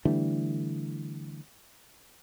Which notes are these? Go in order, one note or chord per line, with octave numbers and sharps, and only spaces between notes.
D3 E3 G3 A3